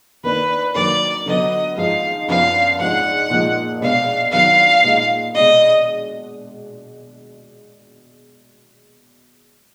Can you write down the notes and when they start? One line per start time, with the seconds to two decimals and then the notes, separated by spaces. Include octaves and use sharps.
0.24 D#3 A#3 D4 B4
0.75 D#3 F#3 A#3 D4 D5
1.26 D3 F#3 B3 D#5
1.77 G#2 F3 G#3 D#4 F5
2.28 F#2 F3 B3 D4 F5
2.79 G#2 F3 G#3 D4 F#5
3.30 A#2 F3 G#3 D#4
3.81 B2 G#3 B3 D4 F5
4.32 D#3 F#3 B3 D4 F5
4.84 A#2 G#3 D#4
5.35 B2 G#3 D4 D#5